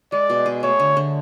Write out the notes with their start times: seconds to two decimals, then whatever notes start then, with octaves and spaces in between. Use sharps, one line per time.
0.12 G#3 D5
0.30 B2
0.46 G#4
0.63 A3 C#5
0.79 D3
0.97 D3